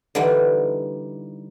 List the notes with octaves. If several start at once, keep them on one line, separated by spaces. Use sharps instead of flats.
D3 E3 G3 D#4